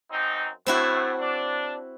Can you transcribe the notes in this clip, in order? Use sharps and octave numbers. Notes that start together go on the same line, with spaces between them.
F#2 C4 D#4
A2 C4 E4 F#4
D4